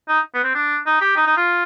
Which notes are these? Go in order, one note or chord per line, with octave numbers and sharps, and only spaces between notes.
D#4
B3
C4
D4
D#4
G4
D#4
D#4
F4